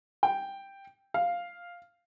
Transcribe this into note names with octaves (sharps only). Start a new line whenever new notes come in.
G5
F5